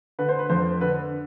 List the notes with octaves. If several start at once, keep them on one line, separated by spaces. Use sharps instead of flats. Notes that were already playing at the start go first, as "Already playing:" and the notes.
D3 B4
C5
B4
F2 C5
D3 B4